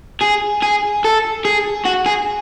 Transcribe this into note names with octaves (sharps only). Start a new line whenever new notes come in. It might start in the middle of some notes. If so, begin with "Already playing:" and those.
G#4
G#4
A4
G#4
F#4
G#4